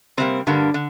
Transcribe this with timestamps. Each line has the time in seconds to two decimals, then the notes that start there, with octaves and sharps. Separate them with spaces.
0.17 C3 G3 A#3 C4
0.47 G2 D3 G3 A#3
0.74 D3